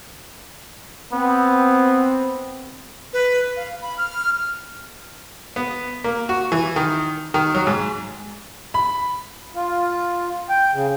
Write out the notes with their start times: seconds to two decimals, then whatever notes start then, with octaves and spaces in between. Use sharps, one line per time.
1.13 B3 C4
3.13 B4
3.57 F5
3.82 B5
3.98 F6
5.56 B3
6.04 A#3
6.29 F#4
6.52 E3
6.76 D#3
7.34 D#3
7.55 F#3
7.67 G#2
8.74 B5
9.55 F4
10.49 G5
10.74 C#3